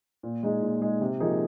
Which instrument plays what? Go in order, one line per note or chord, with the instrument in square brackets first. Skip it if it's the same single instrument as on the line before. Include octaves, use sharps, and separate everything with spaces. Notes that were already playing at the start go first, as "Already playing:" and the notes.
[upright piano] A#2
G#3 D#4 G#4
A#2
G#3 D#4 G#4
C3
F3 A#3 D#4 G#4